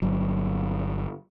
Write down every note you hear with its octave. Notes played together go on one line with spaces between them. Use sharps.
G1 F#3